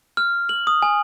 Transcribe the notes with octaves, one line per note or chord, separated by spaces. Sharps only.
F6
F#7
D#6
G#5